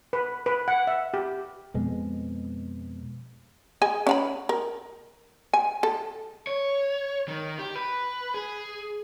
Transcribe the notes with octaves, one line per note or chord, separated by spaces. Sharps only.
B4
B4
F#5
E5
G4
F2 B2 G#3
G#4 D#5 G#5
C#4 F5 B5
A#4
G#5
A4
C#5
D#3
G4
B4
G#4